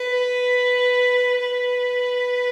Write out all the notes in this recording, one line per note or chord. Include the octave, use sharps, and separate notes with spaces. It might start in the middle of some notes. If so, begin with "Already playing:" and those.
Already playing: B4
B4